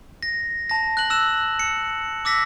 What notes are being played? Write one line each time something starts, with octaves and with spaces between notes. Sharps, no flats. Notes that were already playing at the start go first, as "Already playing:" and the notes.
A#6
A5 A#6
F#6 F#7
E6 F#6 E7
C#7
D6 E6 A#6 B6